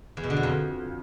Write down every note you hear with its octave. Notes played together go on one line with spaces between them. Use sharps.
E2
B2
D3
E2
F2